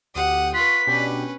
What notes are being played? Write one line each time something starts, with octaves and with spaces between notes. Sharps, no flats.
D2 G4 F#5 D#6
F4 B4 C#6 F#6 B6
B2 C#4 D4 G4 B4